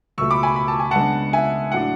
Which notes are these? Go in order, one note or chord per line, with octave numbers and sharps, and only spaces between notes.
C#2 B2 A3 C#6 E6
B5 D6
G#5 B5
B5
A5
G#5
C#3 G#3 B3 D4 F#5 A5
E5 G#5
A2 F#3 A3 D4 F#5